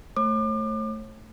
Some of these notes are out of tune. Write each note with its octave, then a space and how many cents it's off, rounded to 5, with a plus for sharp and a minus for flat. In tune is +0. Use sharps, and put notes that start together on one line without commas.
A3 +0 C#5 -40 D6 +35